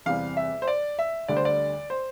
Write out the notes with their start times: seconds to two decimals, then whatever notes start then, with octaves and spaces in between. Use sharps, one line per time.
0.06 E2 C3 G3 F5
0.37 E5
0.62 C5
0.68 D5
0.99 E5
1.28 D2 D3 G3 D5
1.36 C5
1.45 D5
1.90 C5